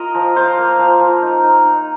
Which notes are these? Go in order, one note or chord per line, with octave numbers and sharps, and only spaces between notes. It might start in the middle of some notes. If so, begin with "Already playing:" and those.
Already playing: F4 A#4 D#5
F3
F4 C5 F5
A#3
F3
F3
D#4
D#4
D#4